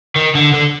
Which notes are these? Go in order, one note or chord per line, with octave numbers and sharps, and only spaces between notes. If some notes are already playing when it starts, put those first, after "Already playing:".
D#3
D3
D3